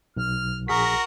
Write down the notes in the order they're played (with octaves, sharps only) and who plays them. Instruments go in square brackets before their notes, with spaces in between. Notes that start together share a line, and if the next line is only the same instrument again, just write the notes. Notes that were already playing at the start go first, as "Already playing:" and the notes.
[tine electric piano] B1 [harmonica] F6
[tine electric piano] A#1 G#4 B6 [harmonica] F#4 A#4